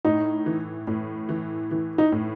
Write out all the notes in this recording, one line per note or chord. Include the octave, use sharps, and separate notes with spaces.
A2 D#4
E3
A2
E3
E3
D#4
A2